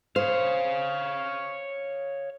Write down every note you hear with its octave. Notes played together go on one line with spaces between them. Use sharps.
C5 C#5 F5